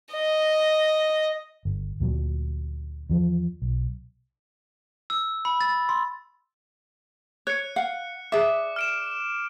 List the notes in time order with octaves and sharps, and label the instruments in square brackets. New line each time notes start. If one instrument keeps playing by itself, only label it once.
[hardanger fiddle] D#5
[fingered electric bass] G1
D2 A#2 F#3
E2 F3
B1
[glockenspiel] E6
B5
A6
C6
[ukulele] C#5 [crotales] F#6 C#7
[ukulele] F5 F#5
[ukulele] G#4 D5 E5 [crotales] D6
[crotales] F6 D7 E7